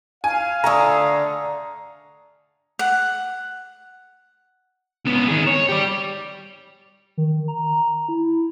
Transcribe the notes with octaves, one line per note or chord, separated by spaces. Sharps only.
F5 G#5
D3 A3 A4 A#5 C#6 D#6
F#5
C#2 B3
D#3 G#4
C#5
G4 D5
D#3
A#5
E4